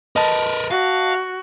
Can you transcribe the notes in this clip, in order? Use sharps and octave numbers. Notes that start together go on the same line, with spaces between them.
A#4 B4 D#5 A5
F#4 F5